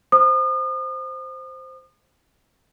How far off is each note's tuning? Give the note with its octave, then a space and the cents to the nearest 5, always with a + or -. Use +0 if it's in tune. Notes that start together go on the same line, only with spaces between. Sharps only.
C5 +0 D#6 -40